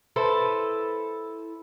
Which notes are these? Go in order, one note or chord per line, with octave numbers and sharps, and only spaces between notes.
E4 A4 B4 C5